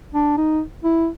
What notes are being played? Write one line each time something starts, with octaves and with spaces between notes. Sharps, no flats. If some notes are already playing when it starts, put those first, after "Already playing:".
D4
D#4
E4